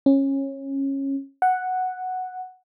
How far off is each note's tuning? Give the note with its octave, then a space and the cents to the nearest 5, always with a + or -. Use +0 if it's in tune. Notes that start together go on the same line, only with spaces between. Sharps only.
C#4 -20
F#5 +0